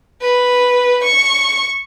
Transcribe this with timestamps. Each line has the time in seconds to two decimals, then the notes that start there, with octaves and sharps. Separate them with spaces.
0.22 B4
1.04 C#6